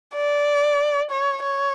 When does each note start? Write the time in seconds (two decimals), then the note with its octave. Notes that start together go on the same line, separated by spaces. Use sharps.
0.15 D5
1.11 C#5
1.43 C#5